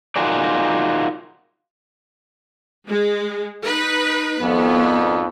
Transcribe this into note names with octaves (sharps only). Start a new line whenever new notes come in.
D#4 F4 F#4 G#4 A#4 D5
G#3
D#4 B4
G#1 F2 B3